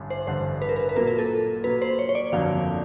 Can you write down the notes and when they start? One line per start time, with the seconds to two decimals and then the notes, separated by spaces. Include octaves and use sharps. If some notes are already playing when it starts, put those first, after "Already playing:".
Already playing: A1 G2 D3
0.10 C5
0.27 A1 G2 D3 C5
0.62 B4
0.69 A#4
0.76 B4
0.89 B4
0.96 A#2 F#3 A#3 A#4
1.07 A#4
1.19 A4
1.64 A#2 F#3 A#3 B4
1.82 C5
1.99 C#5
2.09 C#5
2.15 D5
2.32 G1 F2 D3 F#3 A#3 F5